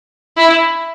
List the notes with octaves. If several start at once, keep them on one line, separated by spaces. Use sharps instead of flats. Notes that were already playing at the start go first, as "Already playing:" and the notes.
E4